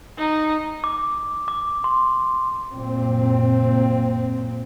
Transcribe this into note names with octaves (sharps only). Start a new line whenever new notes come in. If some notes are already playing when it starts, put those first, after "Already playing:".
D#4
D6
D6
C6
F#1 A#2 C4